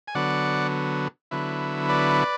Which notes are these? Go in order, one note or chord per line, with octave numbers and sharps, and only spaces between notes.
G#5
D3 F#3 B3 D5 F#5
D3 F#3 B3 E4
B4 D5